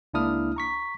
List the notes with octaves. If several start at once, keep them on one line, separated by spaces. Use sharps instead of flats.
C#2 A#3 D4 E4 D#6 F6
A#5 C#6 B6